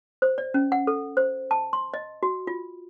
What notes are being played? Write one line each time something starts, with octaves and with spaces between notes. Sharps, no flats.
C5
D5
C#4
F#5
A4
C5
A5
C6
D#5
F#4
F4